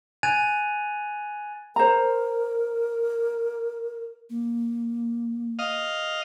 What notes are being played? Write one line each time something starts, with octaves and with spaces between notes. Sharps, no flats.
G#5 F#6 G#6 A6 D#7 F7
A#4 C5 A#5
A#3
D#5 F5